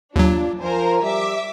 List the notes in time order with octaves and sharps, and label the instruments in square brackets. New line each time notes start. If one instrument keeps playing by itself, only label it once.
[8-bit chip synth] D#2 F#3 [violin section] D4 [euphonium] F4
[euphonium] F3 [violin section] A#4 C5 G#5
[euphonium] G3 [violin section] E5 D6